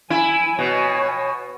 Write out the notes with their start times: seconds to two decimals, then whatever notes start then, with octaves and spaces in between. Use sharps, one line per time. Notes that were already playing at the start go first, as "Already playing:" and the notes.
0.10 E4 G#5
0.59 B2 C#5 G#5